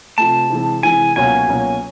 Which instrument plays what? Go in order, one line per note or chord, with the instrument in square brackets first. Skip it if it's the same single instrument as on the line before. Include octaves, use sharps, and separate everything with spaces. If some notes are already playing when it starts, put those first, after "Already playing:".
[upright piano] C3 F3 A3 [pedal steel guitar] A5
[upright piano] C3 E3 G#3
[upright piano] C3 E3 G#3 [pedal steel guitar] G#5
[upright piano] C#2 B2 F#3 A#3 C#4 [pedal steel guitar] G#5
[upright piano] C#2 B2 F#3 A#3 C#4